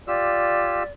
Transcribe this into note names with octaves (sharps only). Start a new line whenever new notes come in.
F4 G4 D5 E6